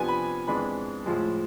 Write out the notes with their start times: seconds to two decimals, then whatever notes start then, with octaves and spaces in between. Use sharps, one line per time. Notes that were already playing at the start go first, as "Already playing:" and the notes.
Already playing: C3 F3 B3 D4 G#5
0.08 B5
0.47 F2 E3 G#3 B3 D4 B5
1.06 A2 F3 G#3